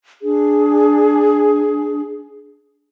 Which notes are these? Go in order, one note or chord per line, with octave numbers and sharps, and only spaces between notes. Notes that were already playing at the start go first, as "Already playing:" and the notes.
D4 G#4